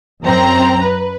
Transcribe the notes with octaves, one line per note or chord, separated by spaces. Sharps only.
F#2 C4 A#5
B4